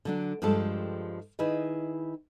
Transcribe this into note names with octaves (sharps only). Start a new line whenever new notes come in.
D3 F#3 D4
G2 F3 G#3 G4 A4 A5
D#3 E4 G#4 B4 D#5